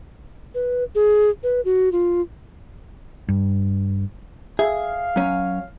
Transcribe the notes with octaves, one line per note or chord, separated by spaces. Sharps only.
B4
G#4
B4
F#4
F4
G2
G#4 E5 F5
F#2 C#4